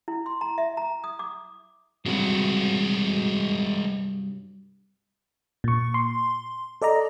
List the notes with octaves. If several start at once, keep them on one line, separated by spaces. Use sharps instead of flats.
E4
C6
A#5
E5
A#5
D#6
D6
G2 C3 F#3 G#3 F#4
A#2 C#6
C6
A4 D5 D#5 A#5